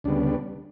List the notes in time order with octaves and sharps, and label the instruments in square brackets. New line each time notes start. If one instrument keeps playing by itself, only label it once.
[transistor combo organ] D2 C#3 G3 B3 D4